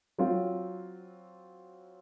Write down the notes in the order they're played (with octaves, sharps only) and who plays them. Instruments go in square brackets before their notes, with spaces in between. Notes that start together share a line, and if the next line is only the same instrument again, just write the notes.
[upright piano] F#3 C4 F4